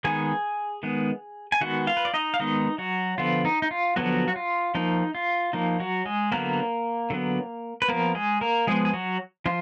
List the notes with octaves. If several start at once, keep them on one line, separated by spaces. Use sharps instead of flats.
D#3 G#3 B3 G#4 G#5
D#3 G#3 B3
G#5
D#3 G#3 B3 F#4 F#5
F4 F5
B4
D5
D#4 D#5
F5
D#3 G#3 B3 D#4 D#5
F#3 F#4
D3 F3 B3 F4
D#4
D#4
F4
D3 F3 F#3 B3 F#4
F#4
F4
F3 A#3 D#4
F4
F3 A#3 D#4
F#3 F#4
G#3 G#4
D3 F#3 A#3 B3 A#4
D3 F#3 B3
B4
F3 A#3 B3 A#4
G#3 G#4
A#3 A#4
F3 G#3 B3 G#4
G#4
F#3 F#4
F3 F4